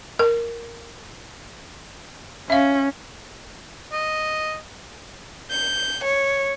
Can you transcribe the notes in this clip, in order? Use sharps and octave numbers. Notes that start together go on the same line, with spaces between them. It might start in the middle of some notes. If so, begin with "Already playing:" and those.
A#4
C#4 E5 F5
D#5
G6
C#5